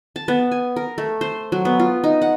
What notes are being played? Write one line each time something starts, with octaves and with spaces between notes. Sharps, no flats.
A5
B3
G#5
A#4
A3
C5
F#3
B3
F4
D#4
F#5